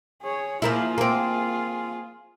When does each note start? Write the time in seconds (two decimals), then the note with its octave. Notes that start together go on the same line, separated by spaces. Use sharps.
0.23 G#4 C#5
0.62 F3 A#3 E4 F4 G#4
0.98 A#3 C4